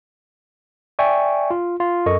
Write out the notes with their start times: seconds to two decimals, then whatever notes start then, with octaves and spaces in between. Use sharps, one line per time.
0.99 D5 E5 G5 G#5 C#6
1.51 F4
1.80 F4
2.06 F#2 A4 A#4 D#5 C#6